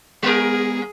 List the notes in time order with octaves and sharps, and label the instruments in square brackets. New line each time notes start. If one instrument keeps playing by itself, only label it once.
[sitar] G3 A#4 [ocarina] B3 [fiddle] G#4